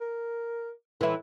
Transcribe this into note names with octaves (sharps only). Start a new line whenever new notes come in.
A#4
A2 E3 E4